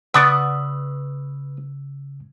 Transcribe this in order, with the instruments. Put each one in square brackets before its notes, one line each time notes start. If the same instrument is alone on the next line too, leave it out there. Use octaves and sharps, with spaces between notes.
[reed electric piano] C#3 E6 [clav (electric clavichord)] B3 D5 [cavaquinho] B4 C#6 D#6